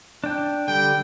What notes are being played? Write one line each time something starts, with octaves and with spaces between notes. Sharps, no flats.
D4 G5
D3 G3 G5